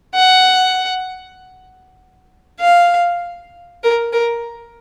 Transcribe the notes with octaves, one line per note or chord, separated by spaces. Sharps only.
F#5
F5
A#4
A#4